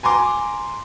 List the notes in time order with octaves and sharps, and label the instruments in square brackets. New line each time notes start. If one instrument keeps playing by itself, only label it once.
[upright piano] G#5 A#5 C6 D6